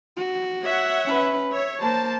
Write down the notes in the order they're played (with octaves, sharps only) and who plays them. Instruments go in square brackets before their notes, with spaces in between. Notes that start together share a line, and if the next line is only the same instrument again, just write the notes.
[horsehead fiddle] F#4
[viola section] C#5 E5 F#5
[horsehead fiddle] C#4 B4
[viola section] C#5 [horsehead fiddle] E5
[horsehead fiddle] A#3 C5 [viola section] A5